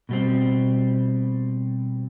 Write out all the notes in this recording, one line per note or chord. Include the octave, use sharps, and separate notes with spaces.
B2 G3 C4